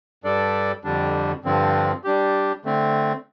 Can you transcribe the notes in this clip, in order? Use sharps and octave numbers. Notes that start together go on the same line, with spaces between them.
G2 G3 D4 A4 D5
F2 D3 G3 D4
G2 D3 F3 C4
G3 D4 G4
D3 A3 C4